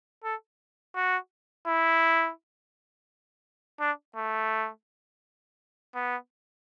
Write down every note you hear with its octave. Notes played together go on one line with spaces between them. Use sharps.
A4
F#4
E4
D4
A3
B3